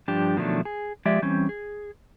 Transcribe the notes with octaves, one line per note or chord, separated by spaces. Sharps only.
G2 F3 D4 G4
B2 D#3 F3 F#3 A3 D4
G#4
F3 G#3 G4 D5 E5
E3 G3 C4 C#4
G#4